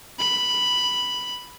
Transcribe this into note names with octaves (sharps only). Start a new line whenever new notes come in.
B5